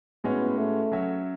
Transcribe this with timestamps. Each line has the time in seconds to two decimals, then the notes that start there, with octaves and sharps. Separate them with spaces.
0.24 A2 G#3 B3 C#4 F#4 C#5
0.58 A3
0.92 F#3 C#4 F#4 C#5 E5